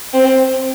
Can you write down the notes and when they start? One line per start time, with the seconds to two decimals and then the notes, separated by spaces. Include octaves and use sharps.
0.13 C4